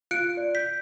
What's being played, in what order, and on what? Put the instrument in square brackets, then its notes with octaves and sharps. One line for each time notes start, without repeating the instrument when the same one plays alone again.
[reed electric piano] F4 [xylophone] F#6 C#7 [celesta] D7
[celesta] D5
[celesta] G6 [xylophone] B6